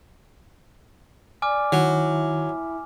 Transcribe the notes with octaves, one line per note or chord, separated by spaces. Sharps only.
D5 G#5 D6 F6
D#3 F#3 E4